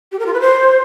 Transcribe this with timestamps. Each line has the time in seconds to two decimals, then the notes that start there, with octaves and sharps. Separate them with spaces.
0.12 G4
0.19 A#4
0.26 F4
0.34 B4
0.41 C5